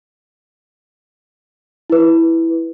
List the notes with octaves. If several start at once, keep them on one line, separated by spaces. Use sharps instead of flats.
E4 B4